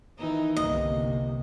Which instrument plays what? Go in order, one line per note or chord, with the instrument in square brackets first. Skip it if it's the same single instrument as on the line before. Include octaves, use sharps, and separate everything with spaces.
[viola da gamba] D#3 E3 D#4
[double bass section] G1 C2 C3 [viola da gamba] A#3 [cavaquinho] D#5